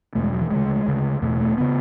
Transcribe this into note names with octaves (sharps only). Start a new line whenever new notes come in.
E2 B2 A3
G#3
F#3
E3
D2 C#3 G#3
D2 C#3
E2 B2 A3
A3
C#3 B3